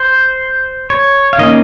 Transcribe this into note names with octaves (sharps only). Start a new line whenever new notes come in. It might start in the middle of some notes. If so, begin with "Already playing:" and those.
Already playing: C5
C#5
F5
D#3 A#3 C#4 D#5